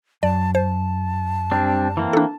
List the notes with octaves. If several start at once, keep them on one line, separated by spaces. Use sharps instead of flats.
F#2 D5 A5
C5 A5
G3 C4 D4
E3 A#3 C4
D4 A4